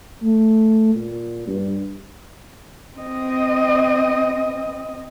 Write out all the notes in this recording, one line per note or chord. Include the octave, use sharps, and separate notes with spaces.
A3
A#2
G2
C4 D#5